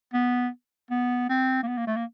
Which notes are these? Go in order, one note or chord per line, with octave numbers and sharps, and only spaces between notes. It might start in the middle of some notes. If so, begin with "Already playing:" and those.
B3
B3
C4
A#3
B3
A#3
A3
A#3